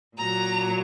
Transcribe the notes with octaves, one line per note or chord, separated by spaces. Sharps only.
A#2 F#3 A#5